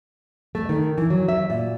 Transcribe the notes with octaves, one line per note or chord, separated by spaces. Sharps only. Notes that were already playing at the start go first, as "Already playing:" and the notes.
A3
D#3
E3
F#3
E5
A#2